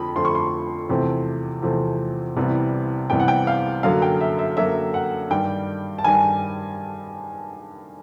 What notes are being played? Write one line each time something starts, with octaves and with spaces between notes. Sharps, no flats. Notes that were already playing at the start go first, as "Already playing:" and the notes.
Already playing: F2 D3 F3 A3 B5
F2 D3 F3 A3 C6
C#6
C6
E2 C3 F3 A3 C4
E2 C3 F3 A3 C4
C2 C3 E3 G3 B3
C2 C3 E3 G3 B3 G5
F#5
G5
F5
F#2 D3 F#3 A#3 F5
G5
E5
E5
F#2 D3 F#3 A#3 E5
F#5
G2 D#3 G3 G5
A5
G2 D#3 G3 G#5